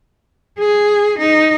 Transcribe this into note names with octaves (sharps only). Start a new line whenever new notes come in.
G#4
D#4